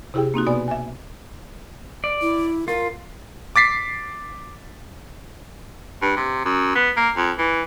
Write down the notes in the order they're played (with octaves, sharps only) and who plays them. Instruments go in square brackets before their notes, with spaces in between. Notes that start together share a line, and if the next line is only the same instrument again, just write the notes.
[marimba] C3 E4 G4 G#4 G5
A#3 C4 D#4 F#4
B2 B3 D5 G#5
E5 G#5
[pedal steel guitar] D5
[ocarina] E4
[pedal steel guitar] F4 [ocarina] A#4
[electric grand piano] D6 A6 B6 C7
[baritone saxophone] G2
C3
F#2
B3
A#3
F2
E3